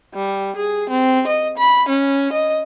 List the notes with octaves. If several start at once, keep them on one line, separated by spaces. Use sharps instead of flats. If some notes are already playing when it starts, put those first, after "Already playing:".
G3
G#4
C4
D#5
B5
C#4
D#5